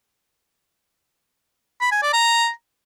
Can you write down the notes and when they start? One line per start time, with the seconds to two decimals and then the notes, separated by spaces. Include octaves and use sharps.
1.81 B5
1.91 G#5
2.02 D5
2.13 A#5